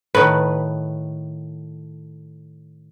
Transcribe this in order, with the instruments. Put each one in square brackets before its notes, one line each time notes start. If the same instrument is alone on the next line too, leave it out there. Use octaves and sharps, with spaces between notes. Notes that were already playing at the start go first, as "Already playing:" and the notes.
[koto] A2 D#3 [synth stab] B4